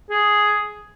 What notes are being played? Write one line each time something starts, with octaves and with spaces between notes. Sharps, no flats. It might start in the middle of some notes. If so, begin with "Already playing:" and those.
G#4